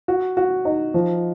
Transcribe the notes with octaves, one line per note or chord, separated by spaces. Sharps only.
F#4
F#4
D#4
F3